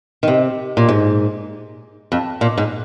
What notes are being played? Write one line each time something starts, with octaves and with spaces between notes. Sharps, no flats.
D#3
C3
A#2
G#2
F2
A#2
G#2